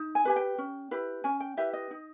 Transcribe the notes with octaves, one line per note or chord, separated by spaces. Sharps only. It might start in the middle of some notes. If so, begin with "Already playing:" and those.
Already playing: D#4
G#5
G4 B4 G#5
G5
C#4
E4 G4 B4
C#4 G#5
G5
E4 G4 B4 E5
D#5
D#4